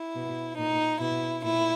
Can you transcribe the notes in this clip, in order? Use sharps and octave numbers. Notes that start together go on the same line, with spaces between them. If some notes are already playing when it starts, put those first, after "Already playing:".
Already playing: E4
B2
A#2 D#4
B2 E4
A#2 E4